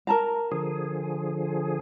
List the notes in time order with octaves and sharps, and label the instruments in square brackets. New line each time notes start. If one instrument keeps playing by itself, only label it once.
[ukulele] A#4 A5 A#5
[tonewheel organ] D3 F3 G#4